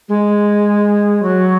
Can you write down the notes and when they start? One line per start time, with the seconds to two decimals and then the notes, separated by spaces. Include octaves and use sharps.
0.09 G#3
1.23 F#3